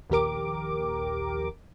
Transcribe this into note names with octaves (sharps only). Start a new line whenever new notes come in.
A#1 D#2 G4 A#4 D6